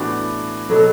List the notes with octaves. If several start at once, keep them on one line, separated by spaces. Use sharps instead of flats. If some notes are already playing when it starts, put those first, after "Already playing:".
Already playing: A2 E3 B3 D4 F#4
B2 F#3 B3 A4